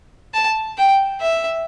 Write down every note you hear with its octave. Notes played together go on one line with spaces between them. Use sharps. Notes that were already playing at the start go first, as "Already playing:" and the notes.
A5
G5
E5